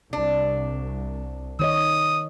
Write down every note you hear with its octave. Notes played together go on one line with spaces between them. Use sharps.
C2 D4
D#3 C#5 D#5 D#6